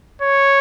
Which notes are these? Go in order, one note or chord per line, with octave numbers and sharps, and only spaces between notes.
C#5